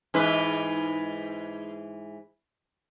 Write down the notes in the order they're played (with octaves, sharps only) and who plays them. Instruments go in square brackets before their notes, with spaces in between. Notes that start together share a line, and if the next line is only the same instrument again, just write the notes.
[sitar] G#2 E3 B4